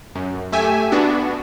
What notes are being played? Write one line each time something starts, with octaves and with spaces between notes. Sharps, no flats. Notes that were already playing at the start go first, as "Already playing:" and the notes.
F#2
A3 G4 E5 G#5
B3 D4 F#4